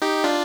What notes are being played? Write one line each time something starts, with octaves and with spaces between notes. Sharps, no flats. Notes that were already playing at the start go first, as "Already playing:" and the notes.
D#4 G4
D4 F4